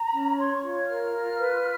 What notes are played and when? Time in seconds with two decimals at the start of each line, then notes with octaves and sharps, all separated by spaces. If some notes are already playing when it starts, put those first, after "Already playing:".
Already playing: A#5
0.12 C#4
0.37 C#5 C6
0.54 C#6
0.63 F4
0.87 A#4 F6
1.13 F4
1.37 B4